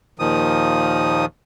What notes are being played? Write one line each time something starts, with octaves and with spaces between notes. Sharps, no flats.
D#2 A#2 D#3 F3 D#6